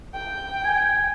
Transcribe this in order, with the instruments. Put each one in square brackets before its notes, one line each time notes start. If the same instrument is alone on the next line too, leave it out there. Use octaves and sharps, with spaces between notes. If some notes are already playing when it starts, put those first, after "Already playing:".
[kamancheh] G5
[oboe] G#5